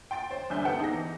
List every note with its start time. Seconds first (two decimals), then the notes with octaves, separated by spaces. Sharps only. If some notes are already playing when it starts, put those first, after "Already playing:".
0.11 G5 C6 A6 D7
0.30 C5 C#5
0.50 C2 D3 E5 G#5 G6
0.65 B3 A4 C5 F#5 G5 A5
0.80 D#4 G#4 A#6
0.92 E3